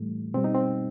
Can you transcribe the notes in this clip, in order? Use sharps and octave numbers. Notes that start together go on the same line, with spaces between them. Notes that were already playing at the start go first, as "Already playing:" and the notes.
Already playing: A2 E3 G3 A3
B2 G3 C4
D#4
C4